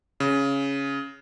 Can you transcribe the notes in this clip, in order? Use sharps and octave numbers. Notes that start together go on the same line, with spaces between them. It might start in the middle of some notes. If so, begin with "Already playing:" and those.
C#3